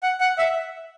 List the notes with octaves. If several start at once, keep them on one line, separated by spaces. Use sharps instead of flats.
F#5
F#5
E5